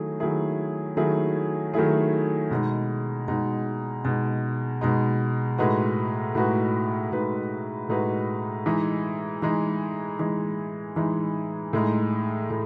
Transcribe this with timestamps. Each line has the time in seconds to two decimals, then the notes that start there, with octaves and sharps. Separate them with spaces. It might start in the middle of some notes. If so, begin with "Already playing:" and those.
Already playing: D#3 F#3 A3 E4 G#4
0.20 D#3 F#3 A3 E4 G#4
0.97 D#3 F#3 A3 E4 G#4
1.73 D#3 F#3 A3 E4 G#4
2.51 B2 G#3 D#4
3.28 B2 G#3 D#4
4.04 B2 G#3 D#4
4.81 B2 G#3 D#4
5.58 A2 G#3 D#4 F#4 B4
6.35 A2 G#3 D#4 F#4 B4
7.12 A2 G#3 D#4 F#4 B4
7.89 A2 G#3 D#4 F#4 B4
8.66 E3 G#3 D#4
9.42 E3 G#3 D#4
10.19 E3 G#3 D#4
10.96 E3 G#3 D#4
11.73 A2 G#3 D#4
12.50 A2